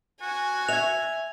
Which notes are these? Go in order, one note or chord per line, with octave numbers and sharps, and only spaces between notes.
F#4 G#5
E5 G#6 F7